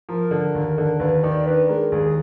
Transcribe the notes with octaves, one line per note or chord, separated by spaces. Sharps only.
F3 A#4
D3
D#2
D3
D#2 B4
D#3 D5
D4 B4
G#3 A#4
D#2 G#4
G#4